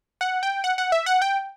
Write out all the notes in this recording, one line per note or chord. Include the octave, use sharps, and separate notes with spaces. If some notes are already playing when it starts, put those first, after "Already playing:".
F#5
G5
F#5
F#5
E5
F#5
G5